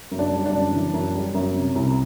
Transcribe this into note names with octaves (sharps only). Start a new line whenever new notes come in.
F#2
D4
G3
D4
F#2
E3
F#2
G3
F#2
C3
C2